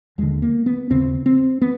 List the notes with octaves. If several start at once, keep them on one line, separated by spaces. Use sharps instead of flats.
D#2 D3 G#3
A#3
B3
D#2 C#3 C4
C4
B3